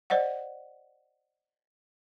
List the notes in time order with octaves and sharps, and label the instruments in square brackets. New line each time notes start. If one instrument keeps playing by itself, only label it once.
[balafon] C5 D5 D#5 F#5